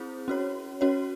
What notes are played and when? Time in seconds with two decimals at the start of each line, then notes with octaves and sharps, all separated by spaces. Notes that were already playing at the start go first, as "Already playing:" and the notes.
Already playing: C4 E4 G#4 C5
0.28 C#4 F#4 C#5
0.81 C#4 F#4 C#5